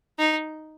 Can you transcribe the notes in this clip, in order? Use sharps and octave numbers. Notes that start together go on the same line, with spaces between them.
D#4